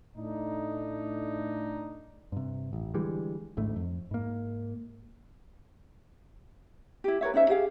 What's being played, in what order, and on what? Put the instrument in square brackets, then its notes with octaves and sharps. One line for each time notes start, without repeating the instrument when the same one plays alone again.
[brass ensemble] A2 A3 D4 D#4
[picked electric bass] G2 C3
A1
D3 E3 G3 G#3
A1 D2 G#2 A3
F2
G#2 A#3
[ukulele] E4 G4
A#4 B4 C#5 E5
C#4 D#4 C5 E5
G4 G#4 F5